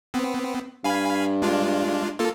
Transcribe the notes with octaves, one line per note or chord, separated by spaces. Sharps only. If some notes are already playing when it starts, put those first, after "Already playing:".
B3 C4
G2 F5 G#5 B5
G#3 D4 F4
A#3 F4 A4